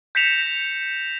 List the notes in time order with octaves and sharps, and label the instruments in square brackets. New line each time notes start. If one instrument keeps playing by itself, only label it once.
[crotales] G6 A#6 B6 C#7 E7 F7